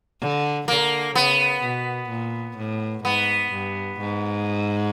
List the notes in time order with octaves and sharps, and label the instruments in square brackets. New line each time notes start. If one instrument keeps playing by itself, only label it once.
[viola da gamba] D3
[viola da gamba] D3 [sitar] A#3
[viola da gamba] C#3 [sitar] B3
[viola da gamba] B2
A#2
A2
[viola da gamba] G#2 [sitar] B3
[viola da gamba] G2
G#2